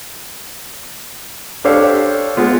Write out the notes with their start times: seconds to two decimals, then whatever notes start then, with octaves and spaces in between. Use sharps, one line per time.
1.64 D4 G4 A4 C5 C#5 F5
2.37 G#3 B3 F4